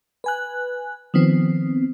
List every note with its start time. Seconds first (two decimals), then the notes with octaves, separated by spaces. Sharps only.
0.24 B4 G#5 F#6
1.14 D#3 F3 B3 C4